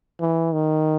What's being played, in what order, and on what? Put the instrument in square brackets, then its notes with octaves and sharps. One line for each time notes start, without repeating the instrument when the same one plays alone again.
[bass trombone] E3
D#3